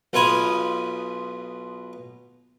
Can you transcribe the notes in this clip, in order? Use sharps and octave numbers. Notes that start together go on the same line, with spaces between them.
B1 B2 F4 G#5 B5 D#6